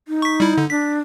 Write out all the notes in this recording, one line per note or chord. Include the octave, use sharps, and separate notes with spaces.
D#4
C#6 B6
G3 E4
D3
D4 B6